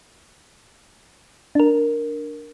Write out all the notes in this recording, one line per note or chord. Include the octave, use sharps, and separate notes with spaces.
D4 A#4